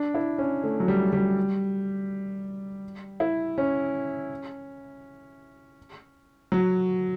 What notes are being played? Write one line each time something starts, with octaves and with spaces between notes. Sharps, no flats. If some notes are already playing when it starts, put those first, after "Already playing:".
Already playing: D4
E4
C#4
A3
F#3
G3
G3
E4
C#4
F#3